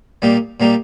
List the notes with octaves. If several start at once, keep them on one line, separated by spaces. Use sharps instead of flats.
A#2 G3 A#3 D#4 G4
A#2 G3 A#3 D#4 G4